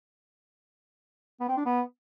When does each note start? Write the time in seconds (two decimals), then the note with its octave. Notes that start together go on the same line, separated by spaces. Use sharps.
1.40 B3
1.49 C4
1.57 D4
1.66 B3